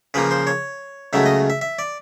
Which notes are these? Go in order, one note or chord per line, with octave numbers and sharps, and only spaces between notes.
C#3 F3 A#3 B4
C5
C#5
C#2 C#3 F#3 A3 E5
D#5
E5
E5
D5